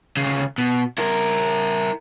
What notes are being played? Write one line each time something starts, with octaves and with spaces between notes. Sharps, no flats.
D2 C#3
B2
E4 A#4